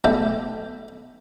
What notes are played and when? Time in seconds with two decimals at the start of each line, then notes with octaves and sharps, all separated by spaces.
0.04 B1 A3 G5 D6